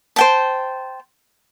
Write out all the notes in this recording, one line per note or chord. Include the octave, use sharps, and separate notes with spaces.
C5 G5 A5